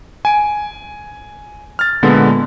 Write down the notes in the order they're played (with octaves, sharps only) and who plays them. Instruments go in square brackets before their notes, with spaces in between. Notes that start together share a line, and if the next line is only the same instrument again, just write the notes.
[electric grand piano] G#5 D7
F6 A6
A#2 D3 G#3 B3